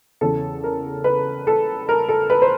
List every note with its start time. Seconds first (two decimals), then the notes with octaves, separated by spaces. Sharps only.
0.21 E2 C#3 E3 A4
0.64 A#4
1.04 B4
1.47 A4
1.89 A#4
2.09 A4
2.30 B4
2.42 C5